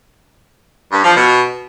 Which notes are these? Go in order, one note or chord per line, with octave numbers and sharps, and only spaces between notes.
G2
F3
B2